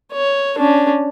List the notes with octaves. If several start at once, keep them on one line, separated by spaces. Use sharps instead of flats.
C#5
C#4 D4